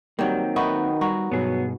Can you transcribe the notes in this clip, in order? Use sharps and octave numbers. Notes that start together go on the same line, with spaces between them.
D#3 F#3 G3 A#3 C4
D#3 B3 D#4 F#4 B4 E5
G3 F#4 A#5
G2 B2 F#3 B3 G#4